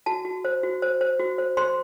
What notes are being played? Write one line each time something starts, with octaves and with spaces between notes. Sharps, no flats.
F#4 A5
F#4
C5
F#4
C5
C5
F#4
C5
C5 C6